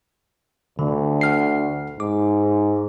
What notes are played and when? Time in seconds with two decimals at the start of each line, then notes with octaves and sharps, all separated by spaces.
0.79 D2 D3
1.21 F#5 F6 C7
2.00 G#2 D6